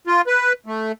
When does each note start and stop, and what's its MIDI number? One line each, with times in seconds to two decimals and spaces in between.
0.07 0.21 65
0.27 0.53 71
0.66 0.92 57